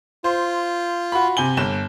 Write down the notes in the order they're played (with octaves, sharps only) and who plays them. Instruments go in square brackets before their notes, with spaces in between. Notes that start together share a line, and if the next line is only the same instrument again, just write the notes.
[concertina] F4 [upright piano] C5
[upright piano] F#4 B5
C3 G#5 G7
G1 E7